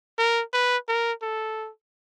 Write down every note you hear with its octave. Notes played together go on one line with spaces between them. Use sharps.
A#4
B4
A#4
A4